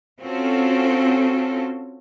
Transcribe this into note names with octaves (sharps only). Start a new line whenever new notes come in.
C4 C#4 F4 F#4 A4